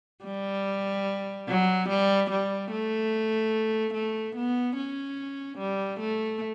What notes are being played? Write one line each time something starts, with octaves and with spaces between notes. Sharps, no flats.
G3
F#3
G3
G3
A3
A3
B3
C#4
G3
A3